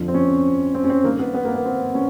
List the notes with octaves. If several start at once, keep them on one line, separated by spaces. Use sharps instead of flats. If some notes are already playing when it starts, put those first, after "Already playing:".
Already playing: F2 D3 F3
C4
C#4
C4
C#4
C4
G2 D#3 A#3
B3
B3
A#3
B3
C4
C#4